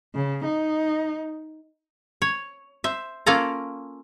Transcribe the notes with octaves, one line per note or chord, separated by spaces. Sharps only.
C#3
D#4
C#5
C5 E5
A#3 C#4 F4 A4 D5 A#5